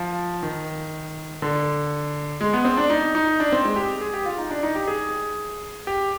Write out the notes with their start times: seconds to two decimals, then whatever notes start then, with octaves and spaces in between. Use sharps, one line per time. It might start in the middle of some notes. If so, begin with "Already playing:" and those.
Already playing: F3
0.43 D#3
1.42 D3
2.41 G#3
2.53 B3
2.65 C4
2.77 D4
2.90 D#4
3.15 D#4
3.40 D4
3.52 C4
3.65 G#3
3.76 G4
4.01 G#4
4.14 G4
4.26 F4
4.38 D#4
4.51 D4
4.63 D#4
4.75 G4
4.88 G#4
5.87 G4